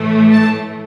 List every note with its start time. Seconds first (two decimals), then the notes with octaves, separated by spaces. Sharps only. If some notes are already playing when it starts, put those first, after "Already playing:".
Already playing: A2 E3 A3
0.32 A5